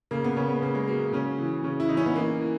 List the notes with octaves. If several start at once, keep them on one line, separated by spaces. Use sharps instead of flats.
C#3 A#3
B3
C#3 C#4
B3
C#3 A#3
G#3
F#3 A#3
C#3 C#4
E3
C#3 C#4
E4
E3 D#4
C#4
B3
E3 A#3
E3